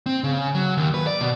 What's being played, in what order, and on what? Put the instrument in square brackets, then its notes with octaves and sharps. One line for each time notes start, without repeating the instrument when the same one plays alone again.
[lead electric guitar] C4
C#3
F#3
D#2
B4
D5
B2